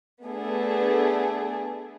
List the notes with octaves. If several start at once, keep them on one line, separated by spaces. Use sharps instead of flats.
A3 B3 D4 G#4 A4